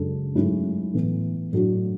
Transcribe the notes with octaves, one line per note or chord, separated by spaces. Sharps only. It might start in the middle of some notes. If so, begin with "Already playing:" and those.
Already playing: F#2 C#3 G#3 D4 A4
G#2 F#3 A3 C#4 E4
A2 E3 B3
A2 F#3 A3 D4 F#4